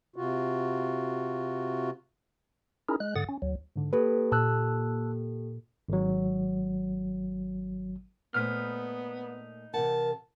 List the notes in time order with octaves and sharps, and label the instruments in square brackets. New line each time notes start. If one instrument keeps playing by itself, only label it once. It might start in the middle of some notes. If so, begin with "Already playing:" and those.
[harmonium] C3 F4 F#4
[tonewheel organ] C#4 D#4 E4 G#4 A#4
G#3 F#6
G#2 D3 F#5 D#6 A6
C#4
D2 F#3
[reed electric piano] G#2 D3
[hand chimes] A#3 G4 A4 [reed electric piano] B4
[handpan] A#2 [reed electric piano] A5 E6 F#6
[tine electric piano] G#1 F#3
[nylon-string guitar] A#2 A3 C5 [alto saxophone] B3 [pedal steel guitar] D#4 B5 F6
[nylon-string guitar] C3 E3 F#5 [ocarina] A#4 [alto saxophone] A5